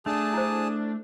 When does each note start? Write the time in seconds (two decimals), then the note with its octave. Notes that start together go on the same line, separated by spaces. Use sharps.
0.06 A3 D4 G#4 A5
0.33 E4 C5